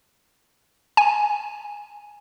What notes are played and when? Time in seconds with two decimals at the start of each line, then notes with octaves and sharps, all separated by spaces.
0.97 G#5